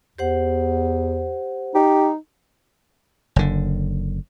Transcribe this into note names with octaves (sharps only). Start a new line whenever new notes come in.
E2 G4 C5 F#5
D#4 G4
F#1 D3